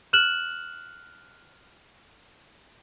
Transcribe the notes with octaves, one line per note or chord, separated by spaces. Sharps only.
F6 F#6 E7 F#7